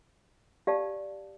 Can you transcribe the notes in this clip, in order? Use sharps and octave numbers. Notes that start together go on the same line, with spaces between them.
G4 D5 F5 A5